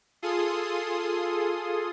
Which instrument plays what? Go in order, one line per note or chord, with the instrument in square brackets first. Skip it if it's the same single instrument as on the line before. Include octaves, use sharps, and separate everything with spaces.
[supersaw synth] F4 G#4 A4 C6 D#6